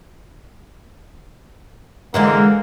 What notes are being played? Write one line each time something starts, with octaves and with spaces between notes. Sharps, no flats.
D3 E3 G#3 A#3